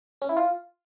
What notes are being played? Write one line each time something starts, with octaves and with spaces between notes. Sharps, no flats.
C#4
E4
F4